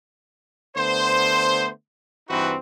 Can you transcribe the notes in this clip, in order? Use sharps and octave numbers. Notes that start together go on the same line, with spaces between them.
D3 A3 B3 C5
G2 E3 C4 D#4 F#4 B4